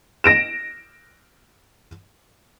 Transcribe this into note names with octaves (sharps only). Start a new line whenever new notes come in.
A#6 D7 E7